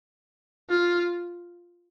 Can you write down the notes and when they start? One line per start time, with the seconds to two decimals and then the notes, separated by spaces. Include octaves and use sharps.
0.70 F4